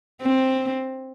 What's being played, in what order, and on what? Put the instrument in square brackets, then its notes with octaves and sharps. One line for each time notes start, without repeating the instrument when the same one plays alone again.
[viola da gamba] C4